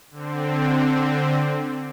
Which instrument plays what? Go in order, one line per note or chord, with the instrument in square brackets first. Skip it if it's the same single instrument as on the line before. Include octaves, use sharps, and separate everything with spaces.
[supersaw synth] D3 C4